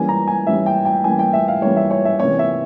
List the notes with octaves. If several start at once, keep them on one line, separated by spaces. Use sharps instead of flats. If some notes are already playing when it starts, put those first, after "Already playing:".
Already playing: E3 G3 A#3 C#4 G#5
A#5
G#5
E3 G3 A#3 C#4 E5
G5
G5
E3 G3 A#3 C#4 G#5
G5
E5
F5
E3 G3 A#3 C#4 C#5
E5
C#5
E5
C3 E3 A#3 C#4 C#5
E5